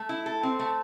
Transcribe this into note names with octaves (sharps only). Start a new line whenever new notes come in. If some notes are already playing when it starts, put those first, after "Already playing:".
Already playing: A3
E4
A4
C4
A3